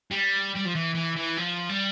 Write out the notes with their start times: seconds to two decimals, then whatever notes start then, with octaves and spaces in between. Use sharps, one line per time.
0.11 G3
0.55 G3
0.65 F3
0.75 E3
0.95 E3
1.17 E3
1.37 F3
1.70 G3